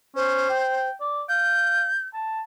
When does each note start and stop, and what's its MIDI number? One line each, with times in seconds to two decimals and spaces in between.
0.16 0.45 61
0.16 0.89 72
0.49 0.93 79
1.00 1.23 74
1.29 1.86 77
1.29 2.08 91
2.14 2.41 81